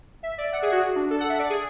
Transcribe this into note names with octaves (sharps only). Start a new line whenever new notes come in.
E5
D5
F#5
G#4
F#4
D4
A4
F#5
E5
D5
G#4